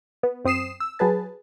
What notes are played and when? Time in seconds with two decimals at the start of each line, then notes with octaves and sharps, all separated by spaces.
0.23 B3
0.44 F#2 C4 D#6 C7 E7
0.80 E6
0.99 F#3 G#4 B4 A5